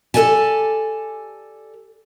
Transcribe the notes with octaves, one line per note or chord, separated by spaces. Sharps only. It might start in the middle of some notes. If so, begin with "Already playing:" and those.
G4 A4 A#4 D5 G#5 A5